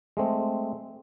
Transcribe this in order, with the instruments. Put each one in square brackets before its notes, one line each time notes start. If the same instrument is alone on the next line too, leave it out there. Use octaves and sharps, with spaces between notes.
[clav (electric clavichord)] G#3 A3 C4